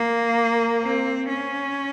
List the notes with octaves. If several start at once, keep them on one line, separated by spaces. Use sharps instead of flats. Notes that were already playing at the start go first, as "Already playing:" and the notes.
Already playing: A#3
C4
C#4